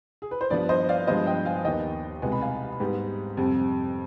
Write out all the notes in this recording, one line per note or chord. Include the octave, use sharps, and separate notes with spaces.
G#4
B4
C5
G2 F3 B3 B4 D5
C5 D#5
D5 F5
G2 F3 G#3 B3 C5 D#5
D#5 G5
F5 G#5
D#2 D#3 B3 D#5 G5
C2 B2 G#3 B3 G#5
B5
F5 G#5
G#2 G3 B3 G4 B4
F2 C3 G3